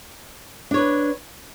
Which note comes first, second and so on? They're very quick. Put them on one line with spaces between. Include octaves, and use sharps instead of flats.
D4 C#5 B4